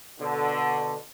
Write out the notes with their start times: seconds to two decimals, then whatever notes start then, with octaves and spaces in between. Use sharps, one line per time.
0.20 B2 D3